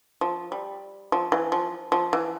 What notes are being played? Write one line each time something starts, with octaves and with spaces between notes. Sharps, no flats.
F3
G3
F3
E3
F3
F3
E3